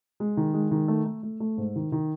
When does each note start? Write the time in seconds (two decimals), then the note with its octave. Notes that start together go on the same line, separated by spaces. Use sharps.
0.20 G#3
0.37 D#3
0.54 G#3
0.71 D#3
0.88 A3
1.06 A3
1.23 A3
1.40 A3
1.57 G#2
1.76 D#3
1.92 D#3